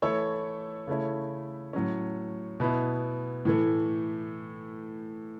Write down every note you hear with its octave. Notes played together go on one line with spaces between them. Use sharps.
E3 A3 E4 A4 C#5
C#3 A3 E4 C#5
A2 F#3 C#4
B2 B3 E4
A2 E3 A3